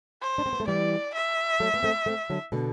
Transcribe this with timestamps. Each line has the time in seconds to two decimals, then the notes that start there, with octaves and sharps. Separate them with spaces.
0.22 C5
0.38 D4
0.46 C4
0.53 B3
0.60 A3
0.68 E3 G3 D5
1.14 E5
1.60 F#3 A3
1.74 B3
1.83 A3 C4
2.06 A3 C4
2.30 D3 F#3
2.52 B2 D3